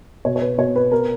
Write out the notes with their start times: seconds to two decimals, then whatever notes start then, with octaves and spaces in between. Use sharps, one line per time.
0.25 B2 C#5
0.36 C#5
0.42 B4
0.58 B2 C#5
0.76 B4
0.92 B3 A#4